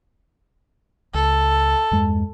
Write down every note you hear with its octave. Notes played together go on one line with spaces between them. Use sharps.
C#2 A4
E2 G2 G#3